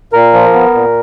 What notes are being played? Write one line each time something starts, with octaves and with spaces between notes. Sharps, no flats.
A#2 A#4
F3
B3
A#2